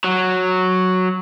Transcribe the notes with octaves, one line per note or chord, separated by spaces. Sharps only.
F#3